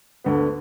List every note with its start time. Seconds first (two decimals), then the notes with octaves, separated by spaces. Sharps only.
0.24 D2 D3 B3